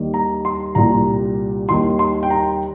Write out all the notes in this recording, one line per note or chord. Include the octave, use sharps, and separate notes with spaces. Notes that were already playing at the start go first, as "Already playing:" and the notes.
Already playing: D#2 D#3 G3
A#5
C6
C2 A#2 G3 A#5
D#2 D#3 G3 C6
C6
G5
A#5